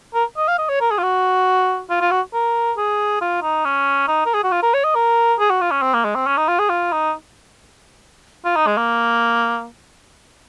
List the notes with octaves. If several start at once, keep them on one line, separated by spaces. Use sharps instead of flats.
A#4
D#5
F5
D#5
C#5
A#4
G#4
F4
F#4
F4
F4
F#4
A#4
G#4
F4
D#4
C#4
D#4
A#4
G#4
F#4
F4
A#4
C#5
D#5
A#4
G#4
F#4
F4
C#4
C4
A#3
G#3
C4
C#4
D#4
F4
G#4
F4
D#4
F4
D#4
G#3
A#3